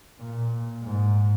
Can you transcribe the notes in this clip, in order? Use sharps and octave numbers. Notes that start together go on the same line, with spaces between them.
A#2
G#2